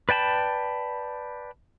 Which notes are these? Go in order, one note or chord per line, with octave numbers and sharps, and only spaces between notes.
B4 D5 G5 A5 B5